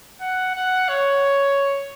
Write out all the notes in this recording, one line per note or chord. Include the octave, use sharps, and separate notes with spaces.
F#5
F#5
C#5